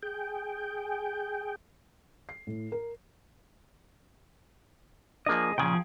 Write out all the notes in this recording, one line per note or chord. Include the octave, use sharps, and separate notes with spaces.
G#4 G5
C7
A2
A#4
F3 A#3 D4 G#4 D#5
A#2 C#3 F3 G#4 G5